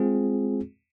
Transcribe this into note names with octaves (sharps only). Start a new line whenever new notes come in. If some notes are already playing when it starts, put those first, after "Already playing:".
Already playing: G#3 C4 F4 G#4